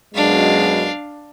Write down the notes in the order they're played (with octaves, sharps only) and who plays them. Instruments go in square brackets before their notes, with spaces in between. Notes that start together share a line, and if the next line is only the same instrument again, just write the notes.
[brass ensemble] F#2 B2 G#3 [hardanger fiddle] D4 F5